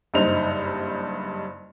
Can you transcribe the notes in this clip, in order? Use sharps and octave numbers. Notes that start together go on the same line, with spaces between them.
F#1 G2 D#4 C5 F7